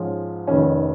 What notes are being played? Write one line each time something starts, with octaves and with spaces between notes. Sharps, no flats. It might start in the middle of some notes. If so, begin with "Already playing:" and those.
Already playing: G#2 F3 G#3 C#4
F1 F2 D#3 C#4